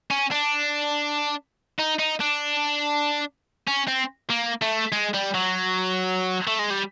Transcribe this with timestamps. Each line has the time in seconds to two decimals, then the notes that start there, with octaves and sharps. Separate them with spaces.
0.11 C#4
0.31 D4
1.79 D#4
1.99 D#4
2.20 D4
3.68 C#4
3.88 C4
4.30 A#3
4.62 A3
4.92 G#3
5.14 G3
5.35 F#3
6.47 A3
6.59 G#3
6.70 G3